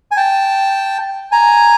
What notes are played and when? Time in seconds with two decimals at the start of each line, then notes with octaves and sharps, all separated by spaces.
0.11 G#5
0.17 G5 A5
1.32 G#5 A#5